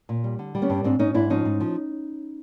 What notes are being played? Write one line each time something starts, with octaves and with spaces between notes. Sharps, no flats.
A#2
G3
D3
G3
B3 C#4
G2
G#2 C4 D4
G#2 C#4 D#4
G#2 D4 E4
F3 C#4 D#4
G#2
F3